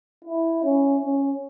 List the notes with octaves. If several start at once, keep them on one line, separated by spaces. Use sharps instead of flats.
E4
C#4
C#4